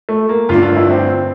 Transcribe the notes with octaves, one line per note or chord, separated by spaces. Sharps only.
A3
A#3
G1 G2 D3 A3 D4 F4
F4
E4
C4